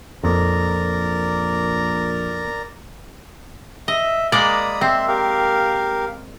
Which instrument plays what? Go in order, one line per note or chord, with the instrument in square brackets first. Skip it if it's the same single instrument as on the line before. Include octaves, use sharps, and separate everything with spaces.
[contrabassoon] A#1 [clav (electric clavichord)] F2 [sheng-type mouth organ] A#4 D5 A#5
[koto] D#5 [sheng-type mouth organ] E5
[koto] G#3 A#3 D5 [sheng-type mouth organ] A#5 B5 D#6
[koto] C4 [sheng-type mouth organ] E5 C6
[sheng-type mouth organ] G4 A#4 F5